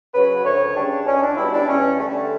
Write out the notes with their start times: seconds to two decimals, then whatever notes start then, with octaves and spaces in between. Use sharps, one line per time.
0.14 C#3 F#3 B4
0.44 D2 C#5
0.76 C#3 G3 D4
1.07 C#2 C#4
1.22 D4
1.37 B2 G3 E4
1.53 D4
1.68 E2 C#4
1.99 D3 G3 A3